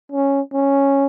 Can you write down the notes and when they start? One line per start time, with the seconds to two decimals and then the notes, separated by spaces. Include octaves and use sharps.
0.12 C#4
0.53 C#4